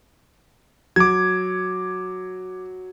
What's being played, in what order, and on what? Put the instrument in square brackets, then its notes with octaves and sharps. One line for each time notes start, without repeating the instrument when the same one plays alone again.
[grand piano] F#3 [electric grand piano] D6 G#6